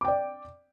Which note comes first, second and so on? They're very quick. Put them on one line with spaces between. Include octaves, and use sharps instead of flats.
D6 G5 D5